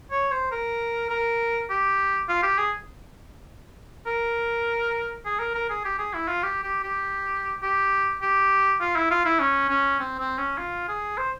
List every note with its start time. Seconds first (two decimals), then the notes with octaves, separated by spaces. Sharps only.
0.11 C#5
0.31 C5
0.52 A#4
1.10 A#4
1.70 G4
2.29 F4
2.43 G4
2.58 G#4
4.07 A#4
5.26 G#4
5.40 A#4
5.55 A#4
5.70 G#4
5.85 G4
5.99 G#4
6.14 E4
6.28 F4
6.43 G4
6.64 G4
6.83 G4
7.63 G4
8.22 G4
8.81 F4
8.96 E4
9.11 F4
9.25 E4
9.40 C#4
9.69 C#4
10.00 C4
10.20 C4
10.38 C#4
10.58 F4
10.89 G#4
11.18 C5